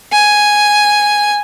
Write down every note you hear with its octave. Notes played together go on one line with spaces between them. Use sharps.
G#5